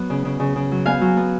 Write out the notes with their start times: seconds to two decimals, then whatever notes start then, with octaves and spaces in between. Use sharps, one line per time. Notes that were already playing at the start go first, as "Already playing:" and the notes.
Already playing: F#3 B3
0.10 C#3
0.25 C#3
0.40 C#3
0.56 C#3
0.71 F#3
0.86 B3 F5 G#5
1.01 F#3
1.17 B3